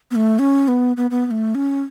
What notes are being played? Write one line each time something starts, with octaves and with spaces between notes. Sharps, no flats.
B3
A3
C#4
B3
B3
B3
B3
A3
C#4